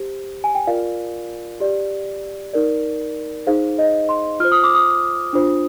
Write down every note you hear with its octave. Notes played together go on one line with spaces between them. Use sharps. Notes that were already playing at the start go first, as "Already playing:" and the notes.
Already playing: G4 C5
G#5
G5
F4 A#4 D5 F5
G4 D5
D#4 A#4 D5
D#4 G#4 C5 F5
D#5
C6
F4 C5 F6
D#6
D6
D#6
D4 F4 C5